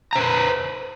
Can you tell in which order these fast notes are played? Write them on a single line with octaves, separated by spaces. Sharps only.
A#5 C5 B4